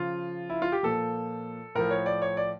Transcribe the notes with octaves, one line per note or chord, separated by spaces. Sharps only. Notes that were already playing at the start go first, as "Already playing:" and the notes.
Already playing: C#3 F3 F4
E4
F4
G4
A#2 F3 A4
A2 F3 A#4
C#5
D5
C#5
D5